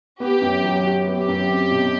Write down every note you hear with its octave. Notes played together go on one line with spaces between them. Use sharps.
B3 G4
F#2
F#3
F#4
B3
G4
F#2
C4
B2